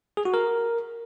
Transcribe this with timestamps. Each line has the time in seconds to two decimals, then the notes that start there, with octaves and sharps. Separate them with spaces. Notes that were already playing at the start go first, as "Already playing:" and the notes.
0.17 G#4
0.25 F#4
0.34 A#4